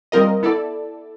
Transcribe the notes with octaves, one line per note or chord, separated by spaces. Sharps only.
G3 C4 F4 A#4 D#5
B3 E4 A4 D5